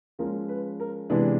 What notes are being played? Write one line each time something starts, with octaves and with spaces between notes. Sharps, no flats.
F3 G#3 C#4 A#4
B4
A#4
C3 E3 G#3 B3 D4 B4